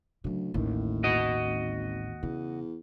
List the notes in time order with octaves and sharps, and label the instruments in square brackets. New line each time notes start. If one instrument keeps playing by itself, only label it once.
[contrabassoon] D2 [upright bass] C#3 F#3
[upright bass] A1 [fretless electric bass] D#2 D#3 [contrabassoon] A2
[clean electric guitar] F#4 D#5
[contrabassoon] G#1
[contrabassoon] E2 [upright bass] C#3